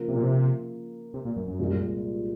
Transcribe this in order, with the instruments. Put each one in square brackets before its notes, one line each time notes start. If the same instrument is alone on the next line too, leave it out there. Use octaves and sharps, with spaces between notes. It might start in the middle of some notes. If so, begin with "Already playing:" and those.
Already playing: [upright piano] C#3 F3 A#3 F4 A#4
[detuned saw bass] C3
A#2
C3
C3
A#2
F#2
F#2
[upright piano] C2 A#2 G#3